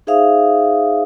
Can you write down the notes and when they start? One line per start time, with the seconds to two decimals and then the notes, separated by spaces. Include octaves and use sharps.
0.07 D#4 G#4 C5 E5 F5 D#6